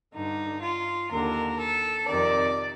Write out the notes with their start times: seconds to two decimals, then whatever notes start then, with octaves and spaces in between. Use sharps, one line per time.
0.14 G2 D3 D#4
0.63 F4
1.11 D#2 D3 A#4
1.59 A4
2.08 F2 C3 D#3 D5